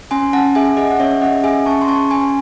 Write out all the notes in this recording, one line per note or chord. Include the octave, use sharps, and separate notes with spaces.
C#4 G#5 C6
C#4 F#5 A5
G#4 E5 G#5
G#4 D#5 F#5
F#5
C#4 C#5 E5
C#4 D#5 F#5
G#4 E5 G#5
C#4 A5 C#6
C6
C#4 A5 C#6
C#4 G#5 C6